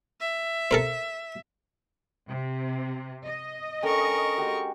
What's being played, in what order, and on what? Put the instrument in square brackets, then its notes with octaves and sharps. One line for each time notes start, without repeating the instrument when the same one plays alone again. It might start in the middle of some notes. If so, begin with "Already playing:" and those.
[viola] E5
[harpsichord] A4 A#4 C5
[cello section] C3
D#5
[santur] C#4 D4 [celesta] A4 G5 [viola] A#4 C#6
[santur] G#3 F#4 G4